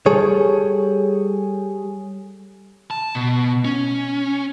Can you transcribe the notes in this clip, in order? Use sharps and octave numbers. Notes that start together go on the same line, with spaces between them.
G3 G#4 A4 C#5
A5
B2
C#4